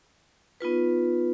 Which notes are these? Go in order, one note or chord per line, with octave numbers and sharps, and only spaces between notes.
B3 D#4 F4 B4